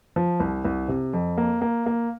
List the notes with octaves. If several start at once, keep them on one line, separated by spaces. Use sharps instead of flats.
F3
C2
C2
C3
F2
A#3
A#3
A#3